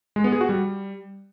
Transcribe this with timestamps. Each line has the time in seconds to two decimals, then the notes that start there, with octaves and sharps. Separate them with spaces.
0.16 G#3
0.24 B3
0.32 G#4
0.41 F#4
0.49 G3